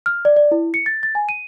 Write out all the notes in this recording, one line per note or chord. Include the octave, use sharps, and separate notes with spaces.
F6
D5
D5
E4
C#7
A6
A6
G#5
D#7